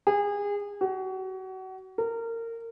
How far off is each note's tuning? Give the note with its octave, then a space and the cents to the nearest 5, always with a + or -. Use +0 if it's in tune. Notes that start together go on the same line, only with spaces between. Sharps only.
G#4 -30
F#4 +30
A#4 -25